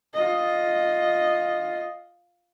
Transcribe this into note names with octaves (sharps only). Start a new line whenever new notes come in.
F4 D#5